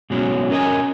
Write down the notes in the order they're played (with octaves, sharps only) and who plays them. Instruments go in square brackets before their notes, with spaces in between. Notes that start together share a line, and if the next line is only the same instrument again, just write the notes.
[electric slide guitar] G#2 B2 F#3 G#3 C#4 F#4
C#4 A#4 B4 D#5 G#5